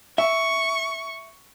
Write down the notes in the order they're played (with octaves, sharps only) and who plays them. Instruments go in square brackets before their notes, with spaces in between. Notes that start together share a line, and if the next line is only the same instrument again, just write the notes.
[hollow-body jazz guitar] E5 [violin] C#6